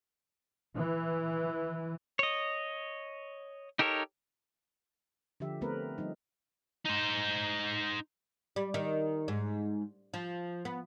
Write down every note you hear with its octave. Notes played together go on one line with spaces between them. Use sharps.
E3
C#5 D#5
D#4 G4 A4 A#4 C#5
D3 F3 G4 E5
A3 B3 C4 A#4 B4
F3 G3 D#4
D#4 C5
G3
D#3
G#2
F3
B3